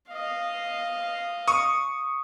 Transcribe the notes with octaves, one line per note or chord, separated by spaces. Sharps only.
D#5 F5
C#6 D#6